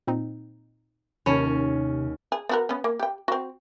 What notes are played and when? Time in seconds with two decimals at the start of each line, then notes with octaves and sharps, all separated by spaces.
0.07 A#2 C4 D#4
1.26 D#2 C3 C#4 C#5 G#5 A5 B5
2.32 G#4
2.49 B3 F#4 A#4
2.69 B3 C#4
2.84 A#3
2.99 G4 G5
3.28 C4 F#4